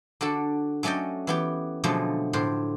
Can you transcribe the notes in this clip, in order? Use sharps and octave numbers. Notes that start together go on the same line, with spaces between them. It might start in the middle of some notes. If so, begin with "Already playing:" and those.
D3 D4 F#4 A4
F#3 A3 C#4 D5 D#5 G5
E3 B3 G4
B2 D3 F3 F#3 G#3 A3
A2 D3 C5